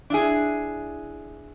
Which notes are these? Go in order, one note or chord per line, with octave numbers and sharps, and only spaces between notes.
D4 E4 G#4